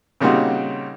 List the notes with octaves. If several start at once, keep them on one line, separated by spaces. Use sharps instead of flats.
A#2 C#3 G3 C4 D#4 F#4